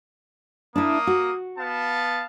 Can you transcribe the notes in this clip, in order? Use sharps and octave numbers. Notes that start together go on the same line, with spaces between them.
A#3 D4 E4 D#6
F#4
B3 F5 A5